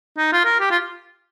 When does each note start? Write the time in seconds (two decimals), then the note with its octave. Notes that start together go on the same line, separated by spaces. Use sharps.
0.18 D#4
0.32 F4
0.45 A#4
0.60 G4
0.70 F4